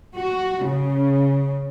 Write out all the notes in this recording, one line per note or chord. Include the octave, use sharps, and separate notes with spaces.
F#4
C#3